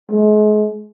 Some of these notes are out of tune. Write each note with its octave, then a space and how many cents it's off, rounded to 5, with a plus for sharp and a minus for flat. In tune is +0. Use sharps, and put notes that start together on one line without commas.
G#3 +35